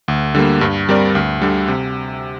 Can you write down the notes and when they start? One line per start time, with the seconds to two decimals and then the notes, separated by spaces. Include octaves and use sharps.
0.08 D2
0.35 D3 G3 A#3
0.61 G2
0.89 G3 C4 A#4 D5
1.15 D2
1.42 D3 G3
1.68 C3